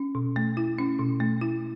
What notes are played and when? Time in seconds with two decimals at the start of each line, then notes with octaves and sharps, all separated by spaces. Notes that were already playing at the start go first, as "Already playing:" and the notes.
Already playing: C#4
0.15 B2
0.36 A3
0.57 E4
0.78 C#4
0.99 B2
1.20 A3
1.41 E4